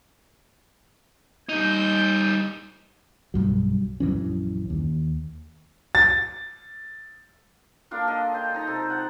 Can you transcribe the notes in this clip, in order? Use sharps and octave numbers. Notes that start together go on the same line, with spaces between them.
G3 D#4 G6
B1 G2 F#3
A#1 F#2 E3 C#4
D#2
A6
A#3 D4 F4 A4
D#5 F5
D#5 F5 G5 A5
D#4 A#5
C3 A4 A#5
F#5 A#5